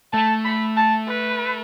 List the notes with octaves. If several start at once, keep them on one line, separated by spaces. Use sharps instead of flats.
A3 A5
B5
A5
B4